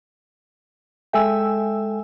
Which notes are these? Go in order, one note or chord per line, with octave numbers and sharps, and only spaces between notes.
G#3 A4 E5 G5 G#5 E6